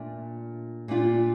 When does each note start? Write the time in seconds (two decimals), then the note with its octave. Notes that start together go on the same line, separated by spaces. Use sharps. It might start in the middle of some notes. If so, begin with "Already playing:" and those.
Already playing: A#2 A3 D4 F4
0.88 A#2 G3 D4 F4